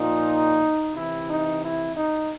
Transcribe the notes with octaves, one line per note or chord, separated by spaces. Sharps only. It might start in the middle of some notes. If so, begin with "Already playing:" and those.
Already playing: A#2 F3 D#4
C3 E3 E4
D#4
E4
D#4